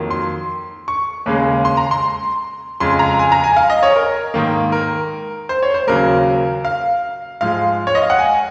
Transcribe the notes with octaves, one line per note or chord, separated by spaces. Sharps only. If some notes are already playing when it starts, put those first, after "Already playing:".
Already playing: F2 D#3 F#3 A#3
C6
C#6
D#2 C#3 G#3
C6
A#5
C6
F2 C#3 G#3 C6
A#5
G#5
A#5
G#5
F5
D#5
C#5
A#4
G#2 D#3 A#3
A#4
C5
C#5
C5
D#2 C#3 F#3 A#4
F5
G#2 F3 G#3 F5
C#5
D#5
F5
F#5
G#5